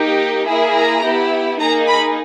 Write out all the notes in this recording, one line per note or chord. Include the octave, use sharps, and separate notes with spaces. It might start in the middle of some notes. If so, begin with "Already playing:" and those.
Already playing: A#3 D#4 G4
A#3 E4 G#4
A#5
B3 E4 G4
A#3 D#4 G#4 A#5
B5